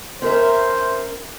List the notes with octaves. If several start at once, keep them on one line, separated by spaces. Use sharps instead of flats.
C#4 A#4 C5 E5